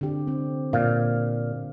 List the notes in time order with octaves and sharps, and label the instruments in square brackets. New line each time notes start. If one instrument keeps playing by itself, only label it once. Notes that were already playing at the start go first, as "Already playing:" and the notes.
[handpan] D3 C4 G4
C4
[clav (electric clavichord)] A#2 [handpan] F5